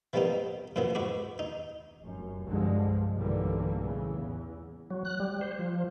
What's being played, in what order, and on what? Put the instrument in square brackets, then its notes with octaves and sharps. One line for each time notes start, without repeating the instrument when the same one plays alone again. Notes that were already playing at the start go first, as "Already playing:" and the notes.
[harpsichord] E3 F3 G3 A#3 B3 D#4
F#2 A#2 E3 F3 B3
G#2 F#4 B4 D6
D#4
[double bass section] F1 F#2
C2 G2 D3 F3 G#3
B1 G2 D3 E3 G3 A#3
A2 C#3 E3
E2
[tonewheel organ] F#3
F#6
G3
C5
F3